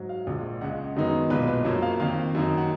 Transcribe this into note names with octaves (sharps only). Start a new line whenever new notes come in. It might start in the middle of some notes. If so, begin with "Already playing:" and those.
Already playing: G#2 F#3
F5
A#1 A#2 G#3
C#2 C#3 G#3 F#5
F#2 D#3 G#3 B3 D#4
B1 A#2 G#3 B4
B4
F#2 F3 A#3 C#5
F5
F2 D#3 A#3 F5
F#2 D#3 A#3 D#4
F#5